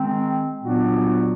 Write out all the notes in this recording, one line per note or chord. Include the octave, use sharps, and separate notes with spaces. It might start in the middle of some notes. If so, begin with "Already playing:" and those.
Already playing: D#3 G#3 C4
A#2 F#3 B3 D4 F#4